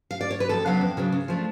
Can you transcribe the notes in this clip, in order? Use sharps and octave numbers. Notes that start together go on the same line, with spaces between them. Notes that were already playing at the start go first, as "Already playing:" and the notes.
F5
D5
C#5
B4
F2 A4
C#3 F#3 B3 D4 F5
F2
C#3 F#3 B3 D4
C#3
F3 A3 D4